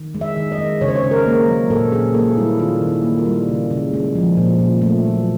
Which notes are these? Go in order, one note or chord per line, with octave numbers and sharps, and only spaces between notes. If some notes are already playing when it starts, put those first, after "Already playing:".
Already playing: D#3
G#3
E5
D#3
D#5
G#3
C#3 C#5
C5
C#5
C#3
A#4
A#3
F#3
A#2 A4
A#2 G#4
A#3 A4
G3 E4
D#3 F4
D#3
E4
A#3
F4
G3
C#3
C#3
G#3
F3
A#2
A#2
A3
F#3